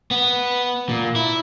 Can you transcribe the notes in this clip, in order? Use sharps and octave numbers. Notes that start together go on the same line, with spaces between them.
B3
A#2
E4